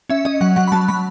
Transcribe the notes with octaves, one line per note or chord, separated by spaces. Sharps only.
C#4 E5
C#4 D#5
F#3 F#5
F#3 F#5
B5
F#3 A5
F#3 B5